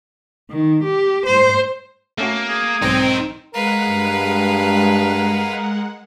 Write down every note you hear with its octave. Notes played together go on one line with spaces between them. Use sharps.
D#3
G4
C5
A3 A#3 C#4 F#4
G#4
B1 G#2 C4 D#4 A#4 D5
G#3 A#4 B4 F5 F#5
G2